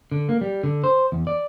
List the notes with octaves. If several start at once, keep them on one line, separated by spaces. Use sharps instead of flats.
D3
A#3
G3
D3
C5
E2
D5